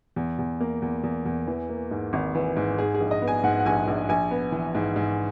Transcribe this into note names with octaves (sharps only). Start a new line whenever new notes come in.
E2
E2
A#3
E2
E2
E2
E3
A#3
G#2
G#1
E3
G#2
G#2 G#4
G#4
A#1
D#5
B3
G#5
G#2 F#5
F#5
A#1 G#5
A#1
A#1 G#5
B3
E3
G#2
G#2